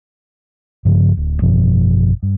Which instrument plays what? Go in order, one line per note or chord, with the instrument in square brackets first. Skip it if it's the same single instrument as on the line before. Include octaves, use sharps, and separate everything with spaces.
[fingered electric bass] G2 C#3 F3
D1
G#1 F#2 B2 F3
G2